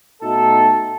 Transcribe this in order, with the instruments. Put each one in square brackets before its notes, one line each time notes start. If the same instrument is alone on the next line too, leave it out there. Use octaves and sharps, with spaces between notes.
[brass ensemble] B2 A3 D#4 F#4 A4